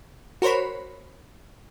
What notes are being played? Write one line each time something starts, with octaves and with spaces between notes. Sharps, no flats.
F#4 A#4 C5 C#5 B5